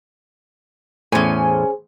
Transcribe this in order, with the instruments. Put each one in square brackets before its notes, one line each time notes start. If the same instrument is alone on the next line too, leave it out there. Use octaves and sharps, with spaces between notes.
[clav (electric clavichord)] E2 A2 [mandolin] C#4 G#5 [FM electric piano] G#4 C5